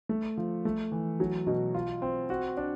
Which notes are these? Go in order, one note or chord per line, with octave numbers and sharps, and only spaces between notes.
A3
F3
A3
E3
F#3
B2
F4
C4
F#4
D4